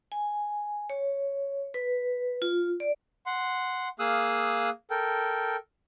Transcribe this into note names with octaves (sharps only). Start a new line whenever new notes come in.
G#5
C#5
B4
F4
D5
F#5 C6
A#3 G#4 F5 D#6 E6 F#6
A4 A#4 G5